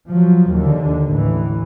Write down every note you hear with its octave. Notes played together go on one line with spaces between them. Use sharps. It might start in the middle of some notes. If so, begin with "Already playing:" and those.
F3 F#3
D#2 D3
A1 E3